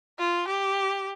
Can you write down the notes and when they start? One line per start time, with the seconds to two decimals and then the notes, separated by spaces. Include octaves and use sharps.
0.19 F4
0.48 G4